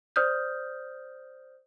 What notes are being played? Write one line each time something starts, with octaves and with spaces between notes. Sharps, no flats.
C5 D5 D#6 F6 G6